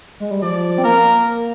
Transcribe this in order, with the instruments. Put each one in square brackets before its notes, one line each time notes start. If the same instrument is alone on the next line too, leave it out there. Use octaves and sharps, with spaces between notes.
[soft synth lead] G#3
G3
[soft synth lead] F3 [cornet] D5
[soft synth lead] C4
[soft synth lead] A#3 [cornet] A#4